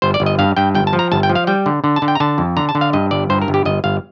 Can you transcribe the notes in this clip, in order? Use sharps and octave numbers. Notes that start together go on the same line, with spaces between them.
G1 C5
D5
G1
D#5
G2 F5
G2 G5
G1 G5
A5
F3
A#5
G1 A5
G5
F3
F5
G3 G5
D3
D3
A5
D3
G5
A#5
D3 A5
F2
D3 A#5
A5
D3
F5
G2 D#5
G1 D5
G2 C5
A#4
G1
G4
G1 D#5
G1 F5